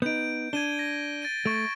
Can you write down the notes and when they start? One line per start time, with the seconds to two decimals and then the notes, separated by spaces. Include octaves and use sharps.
0.02 B3 D#4 G6 D7
0.53 D4 G#6 D#7 G7
0.79 G#6 A#6
1.22 A6 D7 D#7
1.46 A3 C#6 A6 D7